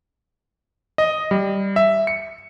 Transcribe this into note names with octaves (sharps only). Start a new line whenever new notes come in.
D#5
G3
E5
C#7